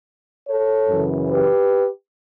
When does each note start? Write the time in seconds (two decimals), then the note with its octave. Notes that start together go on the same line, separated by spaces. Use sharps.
0.48 A4 C#5
0.89 F#2 C#3 E3
1.30 G4 B4